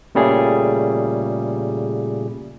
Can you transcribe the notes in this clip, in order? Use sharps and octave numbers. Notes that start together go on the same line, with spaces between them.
A#2 C#3 G3 A3 G#4